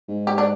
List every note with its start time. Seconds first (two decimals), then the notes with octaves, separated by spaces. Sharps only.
0.09 G#2
0.27 G4
0.38 D4